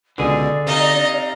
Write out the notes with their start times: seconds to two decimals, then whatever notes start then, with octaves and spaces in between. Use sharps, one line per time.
0.18 C#2 B2 D3 G#4 D5
0.67 C3 D#4 D#5 F5 A#5